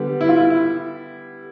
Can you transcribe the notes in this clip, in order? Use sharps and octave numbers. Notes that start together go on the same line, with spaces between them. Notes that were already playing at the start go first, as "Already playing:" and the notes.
Already playing: D3 G3 B3
E4
F4
E4
E4